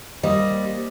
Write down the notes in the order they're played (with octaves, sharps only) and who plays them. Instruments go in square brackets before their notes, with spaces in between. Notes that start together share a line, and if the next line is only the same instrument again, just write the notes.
[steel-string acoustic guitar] G3 [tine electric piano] A#3 G4 C5 [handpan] D#5